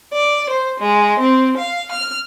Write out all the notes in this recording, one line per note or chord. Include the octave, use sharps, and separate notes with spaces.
D5
C5
G#3
C4
F5
F6